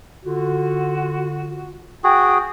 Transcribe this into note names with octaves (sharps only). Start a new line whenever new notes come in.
D3 F4 F#4
F#4 G#4 G5